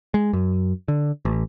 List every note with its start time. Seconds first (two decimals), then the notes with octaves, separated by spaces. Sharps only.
0.14 G#3
0.33 F#2
0.88 D3
1.25 A1